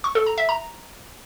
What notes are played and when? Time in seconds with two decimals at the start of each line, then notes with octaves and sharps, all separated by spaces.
0.04 C#6
0.15 A4
0.26 A#5
0.38 E5
0.49 A#5